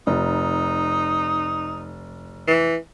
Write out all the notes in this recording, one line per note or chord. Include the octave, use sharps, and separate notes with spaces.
F1 D#4
E3